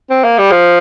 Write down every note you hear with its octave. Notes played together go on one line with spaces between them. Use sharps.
C4
A#3
G3
F3